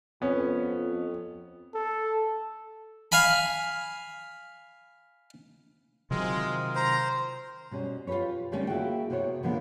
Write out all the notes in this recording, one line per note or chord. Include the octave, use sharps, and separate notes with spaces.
F2 B3 C#4
A4
F5 G#5 B5
C3 D#3 F#3 G#3 C4 F4 A#4
C5 A#5
B2 G3 C#4
F4 G4 A#4 B4 C#5
D3 D#3 G3 A3 C4 C#4
A#3 E4 F#4 G#4 G5
C3 B3 F#4 C5 C#5
D3 D#3 F3 G#3 A#3 B3